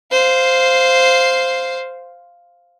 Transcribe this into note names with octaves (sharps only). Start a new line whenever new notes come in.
C5 F5